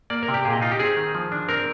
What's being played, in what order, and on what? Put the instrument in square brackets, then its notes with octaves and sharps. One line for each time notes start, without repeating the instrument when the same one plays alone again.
[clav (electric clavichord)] A#3 D5
A#4
C3
G4
A#2 G#4
D#5
D#4 F4
G4
C4 G#4
D#3
F3
D4
C4 A#4